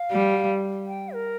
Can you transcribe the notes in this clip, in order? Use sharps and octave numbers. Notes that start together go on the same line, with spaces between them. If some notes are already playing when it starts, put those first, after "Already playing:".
Already playing: F5
G3
G5
A#4